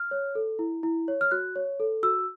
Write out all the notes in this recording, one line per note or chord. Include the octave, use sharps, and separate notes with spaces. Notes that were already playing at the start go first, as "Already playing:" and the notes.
Already playing: F6
C#5
A4
E4
E4
C#5
F6
F#4 F#6
C#5
A4
F#4 E6